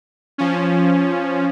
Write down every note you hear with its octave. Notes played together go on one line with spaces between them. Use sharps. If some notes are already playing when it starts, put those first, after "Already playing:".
F3 C#4